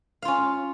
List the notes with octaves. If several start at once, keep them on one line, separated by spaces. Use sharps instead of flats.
C#4 F4 F5